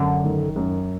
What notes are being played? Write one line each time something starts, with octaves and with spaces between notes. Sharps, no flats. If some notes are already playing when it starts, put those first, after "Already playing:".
Already playing: F#2 D3
D#3
F#2